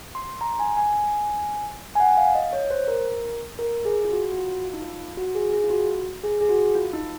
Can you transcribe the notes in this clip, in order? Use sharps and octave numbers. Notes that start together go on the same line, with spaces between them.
C6
C6
A#5
G#5
G#5
G#5
F#5
F5
D#5
C#5
C5
A#4
A#4
G#4
F4
F#4
F#4
F4
F4
D#4
F4
F#4
G#4
G#4
F4
F#4
G#4
G#4
F#4
F4
D#4